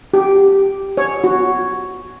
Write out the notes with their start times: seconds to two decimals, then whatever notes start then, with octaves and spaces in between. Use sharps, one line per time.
0.14 G4
0.97 C#5
1.24 F#4